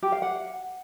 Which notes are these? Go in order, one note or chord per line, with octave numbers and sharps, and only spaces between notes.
G4
F5
F#5